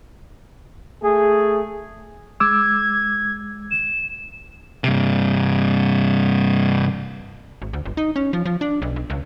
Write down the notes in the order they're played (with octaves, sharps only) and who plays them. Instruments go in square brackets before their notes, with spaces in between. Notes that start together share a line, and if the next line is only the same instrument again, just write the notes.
[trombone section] A3 G#4
[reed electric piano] G#3 D6 E6 [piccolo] G#6
[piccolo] E7
[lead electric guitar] G2 C3
[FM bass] G#1
D2
G1
D#4
C#4
F3
F3
D4
B1
B1
C#2